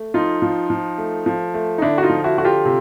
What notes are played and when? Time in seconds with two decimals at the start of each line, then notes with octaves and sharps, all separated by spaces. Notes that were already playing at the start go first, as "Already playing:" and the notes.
Already playing: A3
0.14 F3 D#4 F4
0.42 F3
0.70 F3
0.98 A3
1.26 F3
1.54 A3
1.78 D#4
1.82 D3 D4 E4
1.98 F#4
2.03 D#4 F4
2.10 F3
2.24 E4 F#4
2.38 D3 F#4
2.45 F4 G4
2.65 C3